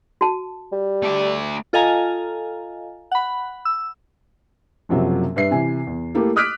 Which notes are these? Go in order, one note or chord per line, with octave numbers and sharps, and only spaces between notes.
F#4 A5
G3
A3 D5
F4 A4 D#5 F5 G#5 A#5
F#5 B5
E6
F#1 F#2 C3 F3 F#3
G2 B4 E5 C7
C3 E3 E4 G#5
E2
A3 A#3 E4 G4 A4
D6 D#6 F6 F#6 B6 D7